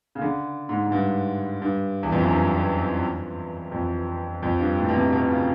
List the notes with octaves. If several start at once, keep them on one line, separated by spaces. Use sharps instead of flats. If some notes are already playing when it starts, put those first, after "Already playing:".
C#3
D3
G#2
G#2
G2
G2
E2
F2
F#2
G2
F2
F2
G2
A2
B2
C3
B2
C#3